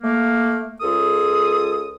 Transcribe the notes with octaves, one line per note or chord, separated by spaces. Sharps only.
A3 A#3
C#2 F4 G#4 A4 D#6